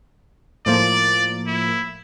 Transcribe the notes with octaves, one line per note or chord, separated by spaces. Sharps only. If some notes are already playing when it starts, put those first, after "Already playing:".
A2 F3 A#3 D5
E4